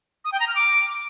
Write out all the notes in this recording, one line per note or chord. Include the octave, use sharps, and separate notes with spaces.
D#6
G5
A#5
F6
D6